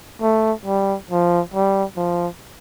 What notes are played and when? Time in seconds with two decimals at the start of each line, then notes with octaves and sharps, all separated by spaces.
0.21 A3
0.66 G3
1.10 F3
1.54 G3
1.97 F3